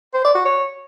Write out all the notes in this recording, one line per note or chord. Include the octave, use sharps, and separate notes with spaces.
C5
D5
F#4
C#5